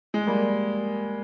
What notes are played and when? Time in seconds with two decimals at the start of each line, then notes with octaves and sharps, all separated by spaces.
0.14 G#3
0.27 G3 A#3